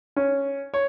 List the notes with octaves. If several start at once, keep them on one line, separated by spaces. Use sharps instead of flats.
C#4
C#5